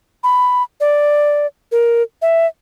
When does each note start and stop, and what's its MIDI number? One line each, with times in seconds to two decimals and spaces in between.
0.23 0.63 83
0.80 1.46 74
1.72 2.02 70
2.22 2.46 76